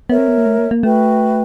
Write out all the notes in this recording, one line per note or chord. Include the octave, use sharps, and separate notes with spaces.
B3 A#4 C#5 E5
C4
B3
A#3
A3
A#3
A#3
A3 F#4 B4 E5 G5